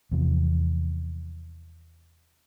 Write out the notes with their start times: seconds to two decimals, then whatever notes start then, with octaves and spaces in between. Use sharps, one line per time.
0.11 E2 C3 F3